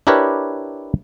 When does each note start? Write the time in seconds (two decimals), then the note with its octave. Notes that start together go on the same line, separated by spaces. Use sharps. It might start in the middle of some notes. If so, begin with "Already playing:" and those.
0.07 D4 E4 G4 A#4 B4 C#5